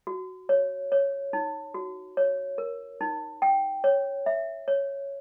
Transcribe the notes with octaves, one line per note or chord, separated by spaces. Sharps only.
F#4
C#5
C#5
D#4
F#4
C#5
A#4
D#4
G5
C#5
E5
C#5